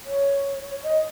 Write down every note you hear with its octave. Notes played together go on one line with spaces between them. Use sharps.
C#5
D#5